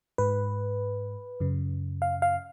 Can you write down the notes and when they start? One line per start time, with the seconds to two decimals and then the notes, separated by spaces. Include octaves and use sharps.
0.18 G#2 B4
1.40 F#2 C#3
2.02 F5
2.22 F5